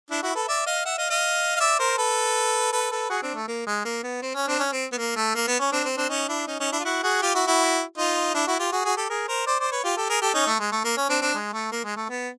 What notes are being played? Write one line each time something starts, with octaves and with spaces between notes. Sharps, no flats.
D4 E4
E4 F#4
A4 B4
D5 E5
D#5 F5
E5 F#5
D#5 F5
D#5 F5
F5
D5 E5
A#4 C5
A4 B4
A4 B4
A4 B4
F#4 G#4
C4 D4
A3
A#3
G#3
A#3
B3
C4
C#4
C4 D4
C#4
C4
B3
A#3
A3
A#3
B3
C#4
C4 D4
C4
C4 D4
C#4 D#4
D4 E4
C#4 D#4
C#4 D#4
D4 E4
F4
E4 F#4
F#4 G#4
F4 G4
E4 F#4
E4 F#4
D#4 F4
D4 E4
E4 F#4
F4 G4
F#4 G#4
F#4 G#4
G4 A4
G#4 A#4
A#4 C5
C5 D5
C5 D5
B4 C#5
F4 G4
G4 A4
G#4 A#4
G4 A4
C#4 D#4
A3
G#3
A3
A#3
C#4
C4 D4
C4 D4
G#3
A3
A#3
G#3
A3
B3